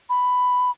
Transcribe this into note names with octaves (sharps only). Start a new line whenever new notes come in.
B5